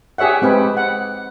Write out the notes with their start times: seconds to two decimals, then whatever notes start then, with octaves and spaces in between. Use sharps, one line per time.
0.18 G4 G#4 C#5 E5 F#5
0.42 G#3 C4 G4 B4
0.77 F#5